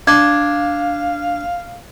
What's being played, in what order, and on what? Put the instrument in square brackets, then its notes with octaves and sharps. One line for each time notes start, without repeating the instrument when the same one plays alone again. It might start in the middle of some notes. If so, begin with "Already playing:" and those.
[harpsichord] D4 [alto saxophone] F5 [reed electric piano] G#6